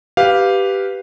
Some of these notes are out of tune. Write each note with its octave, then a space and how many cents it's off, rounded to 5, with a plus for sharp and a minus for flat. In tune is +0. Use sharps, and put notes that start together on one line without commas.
G4 -5 B4 +0 F5 +0